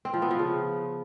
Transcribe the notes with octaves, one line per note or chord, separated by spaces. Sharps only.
C4
F3
B3
F3
C#3